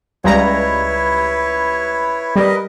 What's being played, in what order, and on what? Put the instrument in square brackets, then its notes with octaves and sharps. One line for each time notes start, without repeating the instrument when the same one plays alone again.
[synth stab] C#2 G3 A#5 [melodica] E4 B4 C#5
[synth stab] G3 [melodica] A#4 B4 D#5